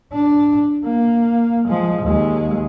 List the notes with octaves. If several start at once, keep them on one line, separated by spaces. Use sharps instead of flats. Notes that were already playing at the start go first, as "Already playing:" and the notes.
D4
A#3
F3 G#3
D#2 G#3